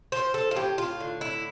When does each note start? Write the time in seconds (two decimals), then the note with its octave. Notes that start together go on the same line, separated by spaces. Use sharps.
0.12 F3 C5
0.34 A4
0.51 F4
0.56 A2 G4
0.78 F4
1.00 D3
1.21 E4